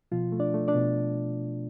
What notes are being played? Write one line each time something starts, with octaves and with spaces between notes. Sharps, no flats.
B2 F3 F4
A3
D4 D5
A3
D4 D5
B2